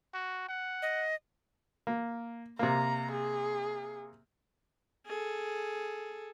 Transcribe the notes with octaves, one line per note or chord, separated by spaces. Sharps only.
F#4
F#5
D#5
A#3
C3 A#3 A#5
G#4
G#4 A4